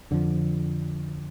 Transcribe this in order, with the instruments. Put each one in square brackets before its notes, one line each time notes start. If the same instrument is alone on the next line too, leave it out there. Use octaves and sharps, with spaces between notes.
[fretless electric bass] F2 D3 F3